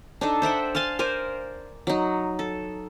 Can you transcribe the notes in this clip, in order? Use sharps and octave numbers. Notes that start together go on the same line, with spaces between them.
D4 D#4 A4
C5 E5 F#5 G5
F5 G#5 A5 C6
A#4 C5 D5 G#5
F#3 D#4
A4